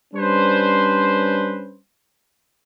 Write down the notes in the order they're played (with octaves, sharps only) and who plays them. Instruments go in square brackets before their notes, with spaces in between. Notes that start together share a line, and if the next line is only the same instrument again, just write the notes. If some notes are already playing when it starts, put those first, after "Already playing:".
[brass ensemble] G3 C#4 D4 B4 C5